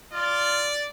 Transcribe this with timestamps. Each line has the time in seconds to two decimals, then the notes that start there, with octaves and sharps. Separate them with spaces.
0.13 F4 D5